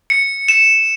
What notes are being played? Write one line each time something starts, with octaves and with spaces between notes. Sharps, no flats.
C#7
E7